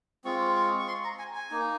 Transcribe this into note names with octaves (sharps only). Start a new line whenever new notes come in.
G#3 C4 F4 C#6
C#6
C#6
C6
A#5
G#5
G#5
A#3 D#4